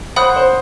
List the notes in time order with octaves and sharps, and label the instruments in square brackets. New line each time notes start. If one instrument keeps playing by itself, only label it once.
[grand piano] C5 [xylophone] F#5 B5 D#6 F#6
[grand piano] C5